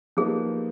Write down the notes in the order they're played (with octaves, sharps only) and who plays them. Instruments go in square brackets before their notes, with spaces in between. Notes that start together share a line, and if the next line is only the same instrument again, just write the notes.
[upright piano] F3 A#3 D#4 G4 B4 [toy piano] G#4